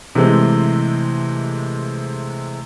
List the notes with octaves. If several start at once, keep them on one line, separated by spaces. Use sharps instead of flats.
C3 E3 G#3 A3 C4